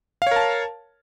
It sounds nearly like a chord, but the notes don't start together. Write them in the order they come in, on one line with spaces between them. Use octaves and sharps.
F5 C#5 A#4 A5